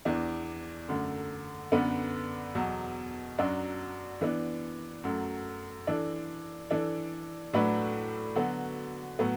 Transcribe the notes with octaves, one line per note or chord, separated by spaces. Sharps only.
E2 E3 D4
F#2 D3 A3
F#2 D3 B3 D4 B4
E2 B2 F#3
F#2 F#3 D4 F#4
E3 B3 D4
F#2 F#3 A3
E3 D4 A4
E3 D4 A4
A2 F#3 A3 D4 B4
D3 F#3 B3 F#4
A2 F#3 B3